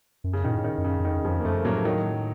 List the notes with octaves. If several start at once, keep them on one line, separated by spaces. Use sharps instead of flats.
F#2
C#3
A#2 D#3
A2
D#3
F#2
C#3
F#2
F2 D#3
F2 C#3 F3
A#3
F#2 F3 A3
A2 F#3 A#3
D#3 F#3